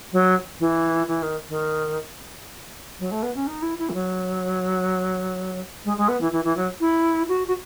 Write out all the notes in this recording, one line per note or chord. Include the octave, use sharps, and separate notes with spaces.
F#3
E3
E3
D#3
D#3
F#3
A3
B3
C#4
D#4
E4
E4
E3
F#3
G#3
G#3
B3
E3
E3
E3
F#3
E4
F#4
F#4